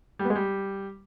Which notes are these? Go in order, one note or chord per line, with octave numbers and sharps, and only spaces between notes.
G3
B3
G#3
G3